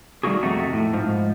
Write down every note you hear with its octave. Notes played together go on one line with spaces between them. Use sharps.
D#3 G3 A3 A#3 F#4 G#4
F2 C3 A3 D#4 F#4
A2
G#2 F3